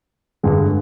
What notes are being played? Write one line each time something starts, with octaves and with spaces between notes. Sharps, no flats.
G2 D3 G#3